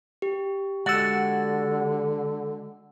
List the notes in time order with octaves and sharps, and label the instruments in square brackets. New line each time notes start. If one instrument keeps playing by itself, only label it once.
[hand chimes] G4
[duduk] D3 [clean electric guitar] G#3 F#4 D5 [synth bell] F#5 E6